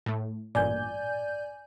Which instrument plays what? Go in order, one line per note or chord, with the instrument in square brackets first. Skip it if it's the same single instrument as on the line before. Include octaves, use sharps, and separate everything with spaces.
[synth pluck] A2 A3
[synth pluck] A1 G2 A#2 [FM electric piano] D5 G#5 G6